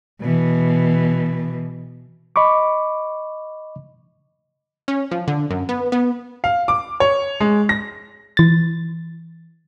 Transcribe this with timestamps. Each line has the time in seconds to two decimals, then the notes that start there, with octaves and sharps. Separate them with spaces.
0.21 B2 E3
2.36 D#5 B5 C#6 D6
4.88 C#4
5.11 F3
5.28 D3
5.50 F#2
5.69 B3
5.92 B3
6.44 F5
6.68 D6
7.00 C#5
7.40 G#3
7.69 A#6
8.37 E3 A6